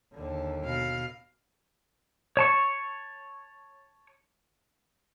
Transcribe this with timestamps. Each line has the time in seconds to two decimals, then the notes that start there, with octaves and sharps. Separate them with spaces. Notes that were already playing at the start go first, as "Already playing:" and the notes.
0.13 D#2 D3
0.64 B2 F5
2.37 C#5 A5 C#6